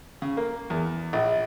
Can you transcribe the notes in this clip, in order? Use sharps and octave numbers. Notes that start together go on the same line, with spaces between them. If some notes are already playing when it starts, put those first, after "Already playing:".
C#3
A#3
E2
A#1